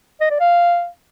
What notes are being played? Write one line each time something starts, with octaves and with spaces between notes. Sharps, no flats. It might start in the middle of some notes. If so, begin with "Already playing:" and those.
D#5
D5
F5